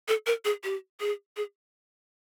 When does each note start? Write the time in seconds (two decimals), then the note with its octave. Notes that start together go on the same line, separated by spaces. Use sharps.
0.08 A4
0.27 A#4
0.45 G#4
0.64 G4
1.00 G#4
1.37 G#4